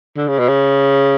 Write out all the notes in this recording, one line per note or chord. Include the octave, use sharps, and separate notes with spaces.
D3
C#3
B2
C#3